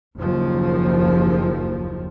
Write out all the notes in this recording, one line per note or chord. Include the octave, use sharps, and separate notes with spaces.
F#1 D#2 F3